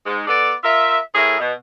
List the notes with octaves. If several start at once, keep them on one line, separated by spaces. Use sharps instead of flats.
G#2 G#3
B3 A4 D5
F4 A#4 E5
A2 A3 G#4 A#4 E5
B2